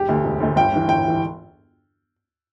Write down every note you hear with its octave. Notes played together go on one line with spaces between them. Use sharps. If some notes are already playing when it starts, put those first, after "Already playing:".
Already playing: E1 G4
D2 D3 A3
E1
D2 D3 A3
G1 G5
G2 E3
G1 G5
E3